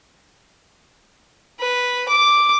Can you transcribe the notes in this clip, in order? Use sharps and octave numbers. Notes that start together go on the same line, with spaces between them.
B4
D6